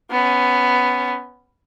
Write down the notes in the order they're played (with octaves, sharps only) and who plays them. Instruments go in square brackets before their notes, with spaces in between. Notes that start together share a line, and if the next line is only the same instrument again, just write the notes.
[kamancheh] B3 C#4